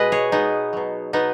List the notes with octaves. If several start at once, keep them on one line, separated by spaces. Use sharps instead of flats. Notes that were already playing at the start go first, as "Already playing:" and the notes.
Already playing: B2 G#3 B4 D#5
G#4 C#5
B2 G#3 B3 D#4
B2 F#3
B2 F#3 B3 D#4